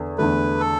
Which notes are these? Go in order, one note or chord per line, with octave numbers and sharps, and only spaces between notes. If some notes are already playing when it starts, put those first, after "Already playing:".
Already playing: E2 D3
E2 D3 A3 B4
A4